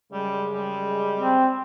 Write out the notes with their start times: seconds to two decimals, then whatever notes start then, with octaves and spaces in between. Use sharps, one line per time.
0.12 F#2 C#3 G3 G#3
0.54 G3
1.18 C4